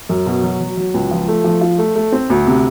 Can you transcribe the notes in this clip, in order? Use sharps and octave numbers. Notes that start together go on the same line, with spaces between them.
F#2
B2
F#3
F#3
F#3
C#2
F3
A3
F3
F4
A3
A3
C4
D2
C3